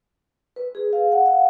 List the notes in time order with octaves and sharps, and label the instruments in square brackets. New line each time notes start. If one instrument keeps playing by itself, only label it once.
[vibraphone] B4
G#4
F5
F#5
F5